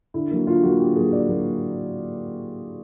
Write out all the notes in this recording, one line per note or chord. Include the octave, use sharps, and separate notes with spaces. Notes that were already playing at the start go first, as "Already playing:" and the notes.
D3 E4
F#3 A#3
D3 F4
F#3 A#3 F#4
D3 G4
F#3 A#3 G#4
D3 D5
F#3 A#3